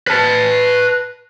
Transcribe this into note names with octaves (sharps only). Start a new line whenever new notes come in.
B4 A5